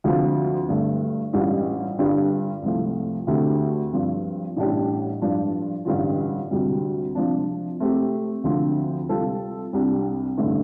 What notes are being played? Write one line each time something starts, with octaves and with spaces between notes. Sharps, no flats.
D2 D3 F3 C4 F4
G2 D3 A3
A1 G2 G3 F4
G2 D3 G3 D4 F4
C2 C3 F3 A3
D2 D3 A3 C4 G4
G2 F3 C4
A1 A2 G3 D4 G4
G2 F3 D4 F4
A1 G2 D3 G3 F4
D2 C3 G3
C3 F3 D4
C3 A3 C4 G4
D2 D3 F3 C4
C3 G3 F4 A4
C2 C3 G3 D4
A1 G2 D3 A3